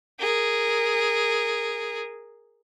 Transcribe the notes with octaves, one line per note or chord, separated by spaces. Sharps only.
G#4 A#4